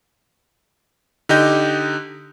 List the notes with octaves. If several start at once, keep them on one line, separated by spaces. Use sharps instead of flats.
D3 D#4 G4 D#5 G6